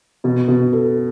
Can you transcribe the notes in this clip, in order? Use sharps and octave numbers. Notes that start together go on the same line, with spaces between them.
B2
B2
A4